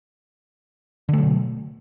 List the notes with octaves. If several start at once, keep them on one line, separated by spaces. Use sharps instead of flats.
B2 D3 F#3 A3